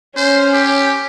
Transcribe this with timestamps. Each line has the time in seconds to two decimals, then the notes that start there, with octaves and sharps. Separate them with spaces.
0.17 C#4 C5
0.54 G4